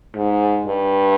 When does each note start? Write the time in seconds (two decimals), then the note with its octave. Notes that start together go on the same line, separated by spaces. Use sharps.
0.15 G#2
0.67 G2